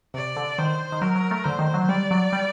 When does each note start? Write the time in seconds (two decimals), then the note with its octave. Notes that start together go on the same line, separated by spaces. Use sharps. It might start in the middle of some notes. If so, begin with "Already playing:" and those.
0.14 C3 D5
0.36 D3
0.58 D#3 C5
0.92 D#3
1.01 F#3 A#4
1.15 F#3
1.31 A3
1.44 D3 C5
1.59 D#3
1.74 F#3
1.89 G3 D5
2.11 F#3
2.33 G3